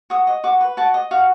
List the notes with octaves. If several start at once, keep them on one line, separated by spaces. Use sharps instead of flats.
F#4 D#6
D#5
F#4 D6
B4
F#4 A5
D#5
F#4 F5